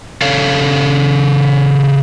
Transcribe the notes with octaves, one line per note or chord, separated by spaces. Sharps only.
C#3 A4 C#5 F5